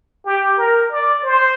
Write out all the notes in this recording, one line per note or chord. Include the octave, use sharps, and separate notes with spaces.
G4
A#4
D5
C5